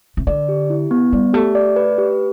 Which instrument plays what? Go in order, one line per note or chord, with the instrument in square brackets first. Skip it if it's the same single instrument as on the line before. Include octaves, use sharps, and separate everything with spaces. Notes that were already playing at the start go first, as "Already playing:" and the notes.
[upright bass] C3
[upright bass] D3 [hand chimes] D5
[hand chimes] G4
E4
B3
[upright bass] G3 [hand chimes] D5
[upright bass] A3 [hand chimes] G4
[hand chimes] D5
B4
G4